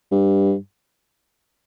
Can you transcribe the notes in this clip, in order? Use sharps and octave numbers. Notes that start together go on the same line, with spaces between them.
G2